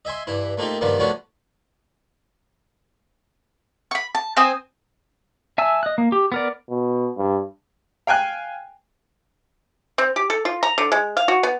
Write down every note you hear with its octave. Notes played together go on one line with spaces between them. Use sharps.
D#5 E5 G#5 C6
G2 E3 E4
A3 A#3 C4 D#4 F4 G4
G2 D#3 F3 G3 A#3 B3
F3 A3 B3 C#4 D4 F#4
B5 C#6
A5
C4 C5 G#5 D#6
E5 G#5 A5 E6
D#5 F#6
A#3
G4
B3 A#4 D5
B2
G2
F5 G5 G#5 F#6
C4
G4
A4
F4
A#5
D3
G#3
F5
F#4
B3